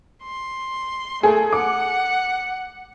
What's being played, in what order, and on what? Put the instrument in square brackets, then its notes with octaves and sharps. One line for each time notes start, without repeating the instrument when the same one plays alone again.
[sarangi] C6
[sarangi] A3 [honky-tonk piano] G#4 A4
[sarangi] F#5 [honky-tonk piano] D6